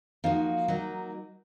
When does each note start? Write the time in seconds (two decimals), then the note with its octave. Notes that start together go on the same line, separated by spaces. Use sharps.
0.24 F3 A#3 D#4 F#4
0.68 F#3 A#3 D#4